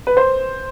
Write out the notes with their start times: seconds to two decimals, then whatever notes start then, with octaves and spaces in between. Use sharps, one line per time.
0.07 B4
0.17 C5